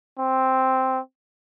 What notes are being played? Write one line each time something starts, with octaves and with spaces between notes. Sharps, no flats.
C4